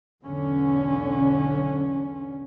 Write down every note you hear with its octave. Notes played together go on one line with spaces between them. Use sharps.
B1 E2 D3 C#4